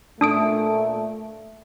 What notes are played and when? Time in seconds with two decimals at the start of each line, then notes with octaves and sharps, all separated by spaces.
0.21 A#2 A3 D4 D#6 D7